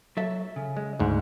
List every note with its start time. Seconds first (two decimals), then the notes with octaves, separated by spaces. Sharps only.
0.17 F#3 A4 E5
0.56 C#3
0.77 G#3
0.99 D2 G#2